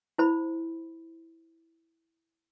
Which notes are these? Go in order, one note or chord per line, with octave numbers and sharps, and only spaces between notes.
E4 C5 B5